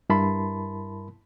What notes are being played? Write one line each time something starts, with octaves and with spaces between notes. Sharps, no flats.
G2 E4 A#4 A5 B5 C6